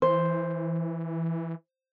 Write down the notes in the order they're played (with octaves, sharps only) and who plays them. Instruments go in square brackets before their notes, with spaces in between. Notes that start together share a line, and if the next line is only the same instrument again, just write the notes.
[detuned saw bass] E3 [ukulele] C5